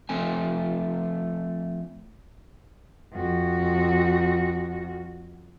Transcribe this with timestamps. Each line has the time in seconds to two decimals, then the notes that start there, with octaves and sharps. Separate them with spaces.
0.09 F3 A3 C4 G#5
3.12 F2 F#4